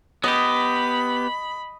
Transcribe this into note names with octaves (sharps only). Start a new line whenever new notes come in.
B3 G4 D#5 B5